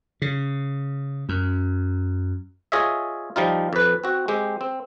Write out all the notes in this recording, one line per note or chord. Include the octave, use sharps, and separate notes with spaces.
C#3
F#2
F4 G#4 C#5 D#5 E5
F3 G3 D#4 F4
F2 B4
C4 F#4
G#3 C4 G4
C4